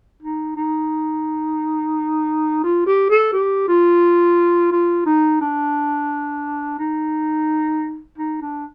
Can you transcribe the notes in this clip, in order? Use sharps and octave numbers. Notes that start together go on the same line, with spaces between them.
D#4
D#4
F4
G4
A4
G4
F4
F4
D#4
D4
D#4
D#4
D4